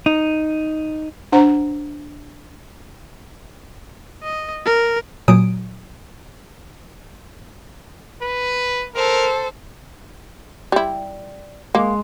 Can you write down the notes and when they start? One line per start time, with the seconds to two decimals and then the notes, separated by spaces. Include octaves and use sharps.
0.06 D#4
1.32 D4 C5 F#5 A#5
4.23 D#5
4.66 A#4
5.28 A#2 F#3 G#5 D#6 D7
8.22 B4
8.95 A4 A#4 C5
10.72 G3 E4
11.75 G#3 A#3